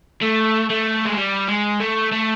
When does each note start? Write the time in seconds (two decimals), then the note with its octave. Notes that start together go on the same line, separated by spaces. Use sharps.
0.23 A3
0.70 A3
1.06 G#3
1.18 G3
1.48 G#3
1.80 A3
2.12 A3